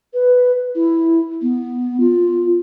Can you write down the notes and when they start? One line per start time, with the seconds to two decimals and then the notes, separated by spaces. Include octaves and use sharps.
0.14 B4
0.75 E4
1.42 B3
2.00 F4